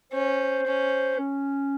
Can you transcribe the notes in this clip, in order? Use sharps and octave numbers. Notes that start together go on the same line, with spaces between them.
C#4 C5
C#4
C#4